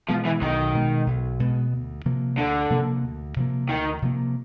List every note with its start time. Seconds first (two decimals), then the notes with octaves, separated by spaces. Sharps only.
0.09 B2 F3 G#3 B3
0.25 E3
0.41 B1 D#3
0.74 B2 G#3 B3
1.06 B1
1.40 B2 G#3 B3
1.72 D2
2.05 C3 F3 A#3
2.38 D2 D3
2.70 C3 F3 A#3
3.04 D2
3.36 C3 F3 A#3
3.69 D2 D#3
4.02 C3 F3 A#3